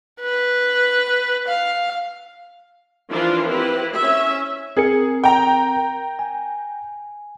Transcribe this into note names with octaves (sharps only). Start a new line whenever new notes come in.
B4
F5
E3 F3 D4 F4 A#4 C5
C4 E4 G4 B4
C#4 E5
C4 G#4 A#4 C#7
G5 A#5
G#5